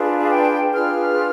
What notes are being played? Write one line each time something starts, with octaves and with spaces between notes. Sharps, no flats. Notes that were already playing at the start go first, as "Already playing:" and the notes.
Already playing: D4 F4 G#4 B4
F5
G5
D4 F4 G#4 B4 F6